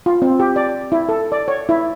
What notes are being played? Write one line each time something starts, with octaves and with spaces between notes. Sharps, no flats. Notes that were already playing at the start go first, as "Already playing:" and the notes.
F4
C4
G4
D5
E4
A4
D5
C#5
E4